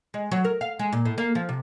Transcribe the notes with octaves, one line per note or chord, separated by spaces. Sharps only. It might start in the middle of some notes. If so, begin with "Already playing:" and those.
G#3
F#3
A#4
F5
G#3
A#2
A2
A#3
F3
C3